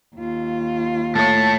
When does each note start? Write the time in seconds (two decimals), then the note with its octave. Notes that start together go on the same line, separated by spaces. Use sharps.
0.16 D#2 F4
1.15 A2 C#5 A5